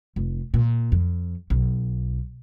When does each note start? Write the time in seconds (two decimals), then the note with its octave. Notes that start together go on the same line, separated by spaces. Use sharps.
0.16 F1
0.54 A#2
0.92 F2
1.50 B1